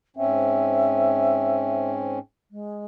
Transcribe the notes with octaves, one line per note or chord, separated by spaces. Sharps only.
G#2 C4 C#4 E5
G#3